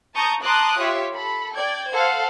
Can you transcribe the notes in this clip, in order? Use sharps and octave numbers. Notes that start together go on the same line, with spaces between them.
A5 A#5 C#6 D#6 G6
A5 A#5 C6 D6 D#6 F#6
F4 G4 C#5 E5
A4 B5
D5 G5 G#6
A4 C5 F5 F#5